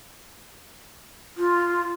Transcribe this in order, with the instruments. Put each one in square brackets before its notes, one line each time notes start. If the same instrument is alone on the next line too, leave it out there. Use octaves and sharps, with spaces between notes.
[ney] F4